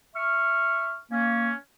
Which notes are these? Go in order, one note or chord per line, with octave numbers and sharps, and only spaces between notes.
E5 C#6 F6
A#3 C#4